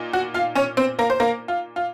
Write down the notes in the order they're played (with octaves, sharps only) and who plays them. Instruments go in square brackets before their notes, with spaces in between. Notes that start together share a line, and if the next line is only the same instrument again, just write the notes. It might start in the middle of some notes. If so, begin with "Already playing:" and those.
Already playing: [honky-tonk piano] A#2 D#4
F#4
F4 F5
C#4 C#5
C4 C5
A#3 A#4
C5
A#3 A#4
F4
F4